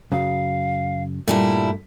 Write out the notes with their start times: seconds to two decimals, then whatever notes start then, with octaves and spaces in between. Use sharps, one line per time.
0.12 F#2 C#3 F5
1.28 G2 A#2 G3 A3 E4 A5